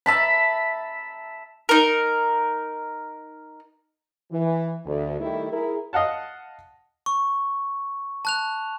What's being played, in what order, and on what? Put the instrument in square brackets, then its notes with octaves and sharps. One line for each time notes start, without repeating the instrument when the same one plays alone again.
[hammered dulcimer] E5 A5 B5
[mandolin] D#4 A#4
[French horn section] E3
D2
D#3 G3 A3 E4
E4 G#4 A#4
[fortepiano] D#5 F5 F#5 A5
[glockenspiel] C#6
A5 F#6 F7